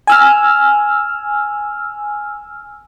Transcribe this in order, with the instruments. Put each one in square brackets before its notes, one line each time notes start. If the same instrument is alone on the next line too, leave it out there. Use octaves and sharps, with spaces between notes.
[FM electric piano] G#5 E6 F6